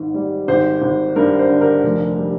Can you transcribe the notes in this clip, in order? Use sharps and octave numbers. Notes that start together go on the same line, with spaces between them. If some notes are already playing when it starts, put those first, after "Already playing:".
Already playing: G#1 G#2
G3
G#1 C5
G#1
G2 A#4
C5
D3
A#4
F1
G3